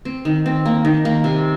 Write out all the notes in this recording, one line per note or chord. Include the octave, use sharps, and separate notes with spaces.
C4
D#3
C4
A#3
D#3
A#3
C3